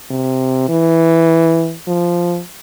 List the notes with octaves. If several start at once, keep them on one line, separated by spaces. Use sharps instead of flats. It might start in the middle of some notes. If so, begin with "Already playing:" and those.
C3
E3
F3